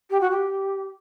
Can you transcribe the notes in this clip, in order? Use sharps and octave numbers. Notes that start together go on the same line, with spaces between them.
G4
F#4
G4